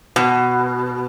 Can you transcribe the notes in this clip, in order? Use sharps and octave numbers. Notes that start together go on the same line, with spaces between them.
B2